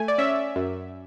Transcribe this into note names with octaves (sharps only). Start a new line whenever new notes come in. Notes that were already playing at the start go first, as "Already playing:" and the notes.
Already playing: A3 G#5
D5
C#4 E5
F#2